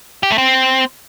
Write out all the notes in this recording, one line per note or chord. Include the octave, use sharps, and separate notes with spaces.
G4
A3
C4